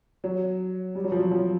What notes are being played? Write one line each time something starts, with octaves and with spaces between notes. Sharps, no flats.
F#3
G3
F#3
F3
F#3
F3